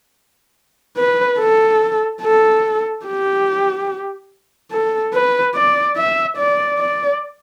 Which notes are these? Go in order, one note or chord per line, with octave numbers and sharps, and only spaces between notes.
B4
A4
A4
G4
A4
B4
D5
E5
D5
D5